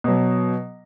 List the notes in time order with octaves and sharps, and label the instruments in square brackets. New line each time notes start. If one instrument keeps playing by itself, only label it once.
[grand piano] B2 F#3